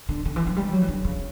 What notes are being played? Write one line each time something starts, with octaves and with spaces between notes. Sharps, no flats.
D3
D3
E3
F#3
G3
F#3
E3
D3
C#3